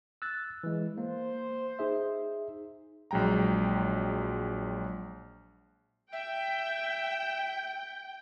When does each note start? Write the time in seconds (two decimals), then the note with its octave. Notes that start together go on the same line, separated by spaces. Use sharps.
0.22 E6 F#6 A6
0.64 E3 G#3
0.98 A#3 C5
1.79 D#4 G#4 E5
3.11 A#1 F#3 G#3 G5 A#5
6.12 E5 G5